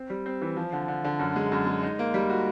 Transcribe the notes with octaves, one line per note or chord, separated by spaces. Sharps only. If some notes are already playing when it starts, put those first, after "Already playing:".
Already playing: C4
G3
C4
E3
F3
D3
D3
D3
F#2
G#3
F#2
G#3
D#4
A#3
G3
F#4